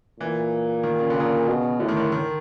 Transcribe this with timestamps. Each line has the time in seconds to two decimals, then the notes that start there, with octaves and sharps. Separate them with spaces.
0.20 A#2 E3
0.83 D#3
1.00 C#3
1.10 D3
1.16 A#2 C#3
1.48 B2
1.80 A2 D3
1.89 D#3
1.97 D3
2.12 D#3